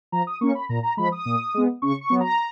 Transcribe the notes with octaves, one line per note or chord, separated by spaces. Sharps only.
F3 A#5
D#6
A#3 C#4 C#6
B5
A#2 A#5
A#5
F3 G#3 B5
D#6
A#2
G#3 B3
C#3 C#6
C#6
F#3 B3
A#5